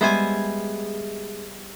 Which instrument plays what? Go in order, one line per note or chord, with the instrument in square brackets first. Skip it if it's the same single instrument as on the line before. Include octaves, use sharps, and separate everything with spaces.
[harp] G3 G#4 E5 [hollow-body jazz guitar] G#3 [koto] B3 C5 G#5